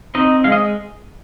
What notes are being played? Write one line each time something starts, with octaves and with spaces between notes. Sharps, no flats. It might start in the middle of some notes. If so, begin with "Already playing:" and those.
C4 D#4 D#5
G#3 F5
D#5